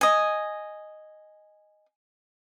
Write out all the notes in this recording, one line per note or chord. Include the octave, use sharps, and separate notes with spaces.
D#5 G#5